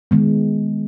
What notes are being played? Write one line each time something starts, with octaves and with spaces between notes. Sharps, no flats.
D#3 G#3 B3